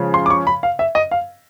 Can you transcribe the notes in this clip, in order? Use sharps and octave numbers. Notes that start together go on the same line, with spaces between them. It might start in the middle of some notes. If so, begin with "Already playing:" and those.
Already playing: C#3 F3 G#3
C6
D6
C#6
B5
F5
E5
D#5
F5